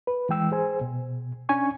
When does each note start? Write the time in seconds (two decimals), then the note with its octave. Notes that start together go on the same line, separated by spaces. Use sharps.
0.07 B4
0.29 E3 G#3 G5 E6
0.52 G#4 C5 G#5
0.81 B2
1.49 C#4 D4 G#5 C#6